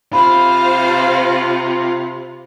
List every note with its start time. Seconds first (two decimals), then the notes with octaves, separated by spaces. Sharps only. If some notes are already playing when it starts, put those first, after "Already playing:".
0.13 C3 F4 C5 F5 B5